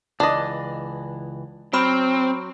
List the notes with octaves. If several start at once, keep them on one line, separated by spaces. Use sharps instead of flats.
C#2 E3 D4 D#5
F#3 C4 B5 F6 D7